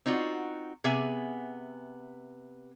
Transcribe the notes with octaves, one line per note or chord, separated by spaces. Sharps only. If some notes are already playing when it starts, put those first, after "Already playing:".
C4 D#4 F4 F#4
C3 B3 G#4 E5 G#5